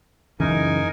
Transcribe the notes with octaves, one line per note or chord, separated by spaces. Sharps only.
C#2 F#2 C#3 E3 D#4 A#4 G#5